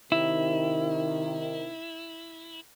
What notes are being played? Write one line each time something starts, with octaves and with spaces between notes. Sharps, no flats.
C3 D#3 E4